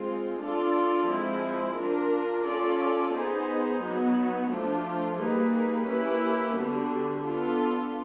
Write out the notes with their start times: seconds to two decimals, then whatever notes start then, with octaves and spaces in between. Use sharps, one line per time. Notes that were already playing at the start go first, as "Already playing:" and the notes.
Already playing: G#3 C4 F4
0.40 D4 F4 A4 D5
1.09 F3 G#3 C4 E4
1.77 D4 F4 A#4
2.45 C#4 F4 A4 D5
3.14 B3 D#4 G#4 C5
3.82 F#3 B3 D#4 F#4
4.50 F3 A3 D4 F4
5.19 G3 A#3 D#4 G#4 B4
5.87 A#3 C#4 E4 G4 B4
6.56 D3 G3 B3 D4 F#4
7.23 B3 D4 F4 A4